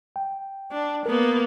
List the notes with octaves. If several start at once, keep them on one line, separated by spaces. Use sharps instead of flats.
G5
D4
A#3 B3 A#4